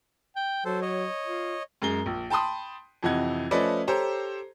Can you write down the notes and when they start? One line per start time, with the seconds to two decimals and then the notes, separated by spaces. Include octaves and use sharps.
0.36 G5
0.65 F#3 A4 C5
0.82 C#5 D#5
1.24 F4
1.82 F#2 G#3 A#5 G7
2.06 A#1
2.30 G5 A5 B5 C6 D#6
3.03 F2 C3 E3 D#5 F#5 G#6
3.51 F3 A3 C#4 B4 D5 D#5
3.87 G4 A4 C5 C#5 A#5